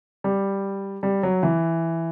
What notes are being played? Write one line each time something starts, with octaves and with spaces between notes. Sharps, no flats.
G3
G3
F#3
E3